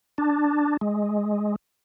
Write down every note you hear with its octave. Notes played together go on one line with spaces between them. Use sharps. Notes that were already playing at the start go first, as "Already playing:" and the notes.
D4
G#3